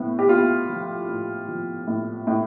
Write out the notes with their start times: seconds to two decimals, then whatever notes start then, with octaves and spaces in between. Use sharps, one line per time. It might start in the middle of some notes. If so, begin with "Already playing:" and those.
Already playing: A2 B3
0.19 G4
0.29 B3 F4
0.69 F3
1.09 A2
1.48 F3
1.87 A2
2.27 A2